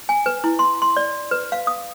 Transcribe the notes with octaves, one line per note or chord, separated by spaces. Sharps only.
G#5
B4
E4
C6
C6
D5
B4
F5
D#6